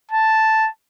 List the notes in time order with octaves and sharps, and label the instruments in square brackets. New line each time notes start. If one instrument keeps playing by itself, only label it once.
[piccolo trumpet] A5